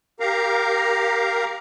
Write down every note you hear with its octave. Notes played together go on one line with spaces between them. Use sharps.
G4 A#4 F5 A#5